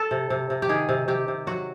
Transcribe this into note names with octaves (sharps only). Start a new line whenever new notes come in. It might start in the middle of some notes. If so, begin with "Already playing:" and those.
Already playing: A4
C3
C3
C3
G4
D#3 G#4
C3
C3 G4
C3
F#3 F#4